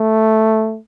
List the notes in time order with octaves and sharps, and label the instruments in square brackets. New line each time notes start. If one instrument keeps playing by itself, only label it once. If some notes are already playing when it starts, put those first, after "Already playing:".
Already playing: [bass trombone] A3